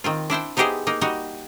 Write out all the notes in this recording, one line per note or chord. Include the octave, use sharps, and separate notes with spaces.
D#3 C4 F4
D4 E4 C5 G5
B3 D#4 E4 G4 G#4 C5
A#3 D#4
G3 D#4 F#4 D#5